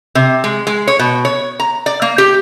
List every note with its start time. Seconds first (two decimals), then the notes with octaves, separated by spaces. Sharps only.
0.15 C3
0.44 G#3
0.67 G#3
0.88 C#5
0.99 B2
1.25 C#5
1.60 A#5
1.86 D5
2.02 A#3
2.18 G4